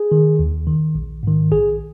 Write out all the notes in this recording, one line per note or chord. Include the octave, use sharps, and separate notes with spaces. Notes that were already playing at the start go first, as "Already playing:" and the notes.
Already playing: G#4
D#3
D#2
D#3
A#1
G#2 D#3
A#1 G#4